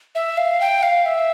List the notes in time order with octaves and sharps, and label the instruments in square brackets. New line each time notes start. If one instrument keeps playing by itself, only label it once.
[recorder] E5
F5
G5
F5
E5